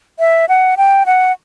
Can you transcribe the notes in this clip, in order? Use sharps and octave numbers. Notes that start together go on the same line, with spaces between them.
E5
F#5
G5
F#5